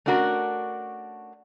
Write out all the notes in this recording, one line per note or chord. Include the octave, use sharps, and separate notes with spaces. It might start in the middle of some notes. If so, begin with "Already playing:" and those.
A3 C#4 D4 F#4 A#4